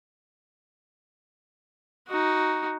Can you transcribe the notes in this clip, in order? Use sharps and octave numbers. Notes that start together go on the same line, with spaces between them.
D#4 F#4